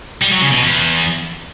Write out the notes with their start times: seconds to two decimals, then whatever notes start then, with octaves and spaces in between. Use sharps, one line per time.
0.22 G3
0.32 F#3
0.42 C#3
0.52 B2
0.62 E2